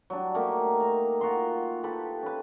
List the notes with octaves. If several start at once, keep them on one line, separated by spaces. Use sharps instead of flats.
F#3 G3 D4
A3 A#3 D#4 G4
A#5
F4 F#4 A#5 C6
G4 A4 B4
C#4 B4